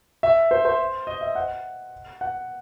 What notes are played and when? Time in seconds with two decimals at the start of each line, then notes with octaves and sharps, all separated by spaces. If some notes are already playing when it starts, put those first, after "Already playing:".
0.23 E5
0.51 C5
0.65 C5
1.07 D#5
1.21 E5
1.35 F#5
2.21 F#5